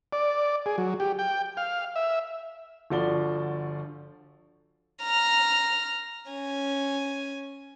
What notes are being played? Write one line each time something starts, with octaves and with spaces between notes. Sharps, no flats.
D5
G#4
F#3
G4
G5
F5
E5
G1 D3 F3 F#4 D5 G7
A#5 F6
C#4 G#5